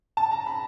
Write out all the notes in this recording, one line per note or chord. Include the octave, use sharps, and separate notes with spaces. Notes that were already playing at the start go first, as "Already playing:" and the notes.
A5
A#5
B5